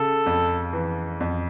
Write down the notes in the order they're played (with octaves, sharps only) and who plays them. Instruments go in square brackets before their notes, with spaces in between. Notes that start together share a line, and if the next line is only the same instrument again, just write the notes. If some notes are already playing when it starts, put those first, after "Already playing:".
Already playing: [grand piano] C#3 [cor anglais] A4
[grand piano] F2
E3
F2